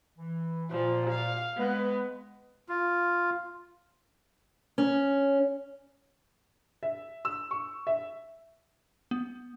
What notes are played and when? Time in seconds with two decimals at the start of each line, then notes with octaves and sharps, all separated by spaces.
0.18 E3
0.71 A#2 F3
1.10 F5
1.57 G#3 B3 B4
2.69 F4
4.78 C#4
6.83 E5
7.25 E6
7.51 C#6
7.87 E5
9.11 B3